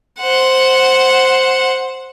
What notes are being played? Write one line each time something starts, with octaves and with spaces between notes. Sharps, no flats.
C5 F#5